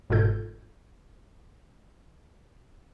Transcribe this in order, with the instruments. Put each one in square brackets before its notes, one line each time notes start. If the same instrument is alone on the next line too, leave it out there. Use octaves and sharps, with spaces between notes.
[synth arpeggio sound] G1 G#2 B2 F4 A4 G6